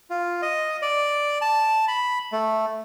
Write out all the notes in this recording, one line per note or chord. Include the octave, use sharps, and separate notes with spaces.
F4
D#5
D5
A5
B5
A3